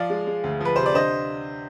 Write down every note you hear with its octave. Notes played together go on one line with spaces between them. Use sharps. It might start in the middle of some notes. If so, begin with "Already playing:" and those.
Already playing: F3 D5 F5
G#3
G#3
D2
F3 B4
C3 C5
D5
D3 C5 D#5